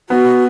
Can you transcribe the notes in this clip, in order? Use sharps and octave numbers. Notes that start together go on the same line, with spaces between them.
B3 F#4